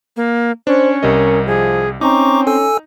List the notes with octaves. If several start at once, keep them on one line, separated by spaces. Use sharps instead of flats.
A#3
C#4 D4 C5
C2 G3 A#4 D#5
F3 G#4
C4 C#4 D#4 A#5 C#6 D6
A4 G#5 E6